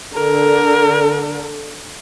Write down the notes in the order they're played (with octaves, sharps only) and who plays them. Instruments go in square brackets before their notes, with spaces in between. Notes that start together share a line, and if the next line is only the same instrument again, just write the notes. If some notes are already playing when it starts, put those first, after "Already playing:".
[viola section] D3 [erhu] A#4